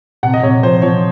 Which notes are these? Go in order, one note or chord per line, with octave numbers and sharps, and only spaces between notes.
C3 F#5
D#5
C3 C#5
F3 C5
F3 C#5